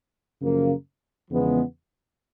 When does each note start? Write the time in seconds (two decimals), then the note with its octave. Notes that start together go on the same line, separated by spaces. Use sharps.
0.40 F#2 C#3 F3 A#3
1.30 E2 C#3 F3 G#3 B3